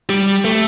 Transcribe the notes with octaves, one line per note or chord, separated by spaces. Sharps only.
G3
A3